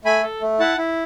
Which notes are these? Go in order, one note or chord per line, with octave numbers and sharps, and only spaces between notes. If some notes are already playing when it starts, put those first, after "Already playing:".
A3 G#5 B5
A4
A3
E4 F#5 A5
E4